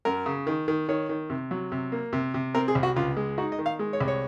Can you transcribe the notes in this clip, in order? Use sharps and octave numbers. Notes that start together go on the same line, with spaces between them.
F#2 A#4
C#3
D#3
D#3
D#3 C#5
D#3
C3
F#3
C3
A#3
C3
C3
C4 A#4
G#4
C2
F#4
C#2 F4
G#3
D#4 F#4
D#5
D#3
F5
G#3
C#5
C2
C#5